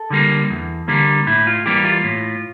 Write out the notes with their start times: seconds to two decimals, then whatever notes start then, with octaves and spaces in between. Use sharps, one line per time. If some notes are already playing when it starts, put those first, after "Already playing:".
Already playing: A4
0.10 D3 G3 A#3
0.50 E2
0.88 D3 G3 A#3
1.27 A2 E4
1.47 F4
1.66 E3 G3 A#3 G4
1.85 F4
2.04 A2